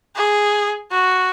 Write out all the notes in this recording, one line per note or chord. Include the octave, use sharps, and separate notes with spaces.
G#4
F#4